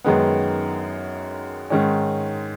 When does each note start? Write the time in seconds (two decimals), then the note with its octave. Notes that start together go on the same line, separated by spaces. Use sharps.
0.04 F#2 D#3 G#3 B3
1.70 G#2 D#3 G#3 C#4